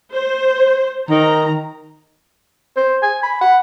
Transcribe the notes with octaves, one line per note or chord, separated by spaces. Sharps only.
C5
D#3 A#5
C5
G#5
B5
F#5